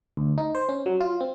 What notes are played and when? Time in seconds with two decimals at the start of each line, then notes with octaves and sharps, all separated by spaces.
0.17 D2
0.38 D#4
0.55 C5
0.69 C#4
0.86 F#3
1.01 F4
1.21 C4